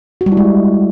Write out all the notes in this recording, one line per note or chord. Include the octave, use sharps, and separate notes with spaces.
F#4
G3
E4
G#3